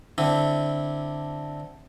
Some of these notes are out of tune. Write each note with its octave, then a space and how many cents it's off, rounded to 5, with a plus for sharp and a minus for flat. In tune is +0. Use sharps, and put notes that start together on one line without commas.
D3 +0 C4 +0 E4 +0